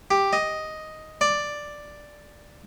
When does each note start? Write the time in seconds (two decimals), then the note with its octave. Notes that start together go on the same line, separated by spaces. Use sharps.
0.11 G4
0.33 D#5
1.21 D5